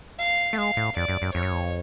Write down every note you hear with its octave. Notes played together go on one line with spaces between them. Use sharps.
F5
A3
G#3 F5
A2
F2 D5
F#2
F#2
F2 C#5
F#2
F2